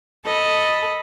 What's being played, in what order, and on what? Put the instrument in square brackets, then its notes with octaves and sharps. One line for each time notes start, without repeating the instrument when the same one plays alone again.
[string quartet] A4 D#5 A5 B5